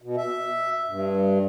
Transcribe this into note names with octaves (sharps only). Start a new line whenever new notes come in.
B2
E5
G2